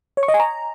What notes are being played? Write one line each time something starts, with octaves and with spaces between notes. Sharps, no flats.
C#5
C#6
D#5
G#5
A#5